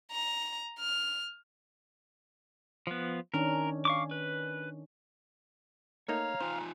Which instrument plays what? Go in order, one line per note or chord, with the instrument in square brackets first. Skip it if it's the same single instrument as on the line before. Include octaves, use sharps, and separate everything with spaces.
[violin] A#5
F6
[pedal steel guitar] F3 B3
[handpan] D#3 C#4 D4 [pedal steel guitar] A#4
[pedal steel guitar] F5 C#6 D6
B4
[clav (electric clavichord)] A3 A#3 D#4 [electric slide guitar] C#5 [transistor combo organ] F5 [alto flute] A#5
[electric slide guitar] D#4 F4 G#5 [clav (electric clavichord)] C5